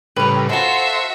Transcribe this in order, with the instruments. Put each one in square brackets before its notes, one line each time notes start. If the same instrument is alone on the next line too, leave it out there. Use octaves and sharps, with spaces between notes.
[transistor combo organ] A2 C#3 G3 [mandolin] A#4 B4
[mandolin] F4 A4 [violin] F#4 E5 [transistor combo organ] C5